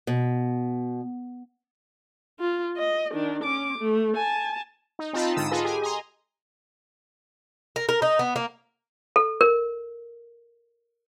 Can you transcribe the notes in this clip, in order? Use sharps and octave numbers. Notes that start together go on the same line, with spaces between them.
B2
F4
D#5
D#3 D4
C#4 D6
A3
G#5 A5
D#4
C4 D#4 F4 A5 B5
G#2 D3 D#6 E6
F4 G#4 A4 B4 D#5
G4 G#4 G#5
D#5 G#5 A#5 C6
A#4
A#4
D#4
B3
A#3
A4
A#4